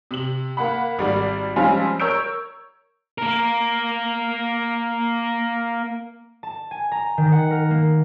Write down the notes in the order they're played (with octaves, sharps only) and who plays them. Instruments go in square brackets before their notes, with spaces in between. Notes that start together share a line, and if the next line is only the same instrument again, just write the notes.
[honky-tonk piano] C3 F#7
A#3 F#5 B5
G#1 G3 D5
F3 G3 G#3 C4 C#4 F4
A#4 C#5 E6 G6 D7
[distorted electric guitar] A#3 A#4
[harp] A5
G#5
A#5
D#3
F#5
A#4
A#3